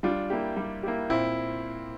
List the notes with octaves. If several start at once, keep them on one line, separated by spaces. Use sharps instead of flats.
G3 D4 F4
A#3 E4 G4
G3
A#3 E4 G4
A#2 C4 E4